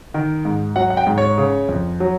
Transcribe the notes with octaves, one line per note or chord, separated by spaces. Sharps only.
D#3
G#2
F#3 F#5
F#5
G5
G#2
C#5
C#3
F2
F#3